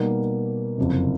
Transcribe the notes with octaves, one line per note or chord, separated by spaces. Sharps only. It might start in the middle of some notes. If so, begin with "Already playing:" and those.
Already playing: B2 G3 A#3 D#4
F#1 F2 C3